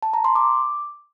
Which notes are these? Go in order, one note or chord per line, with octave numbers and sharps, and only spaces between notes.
A5
A#5
C6
D6